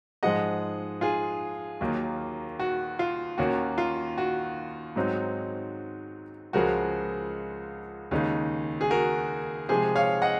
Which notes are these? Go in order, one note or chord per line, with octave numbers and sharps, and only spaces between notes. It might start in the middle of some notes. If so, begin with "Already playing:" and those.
G#2 F3 G#3 D#5 F#5
F4 G#4
D#2 D#3 F#3 A#3
F#4
F4
D#2 D#3 A#3 C#4 F#4
F4
F#4
G#2 F#3 C4 D#4
C#2 C#3 F3 G#3 F#4 A#4
D#2 C#3 G#3 D#4
G#4
F#4 A#4
C3 F3 G#3 G#4 C5
C#5 F5
D#5 F#5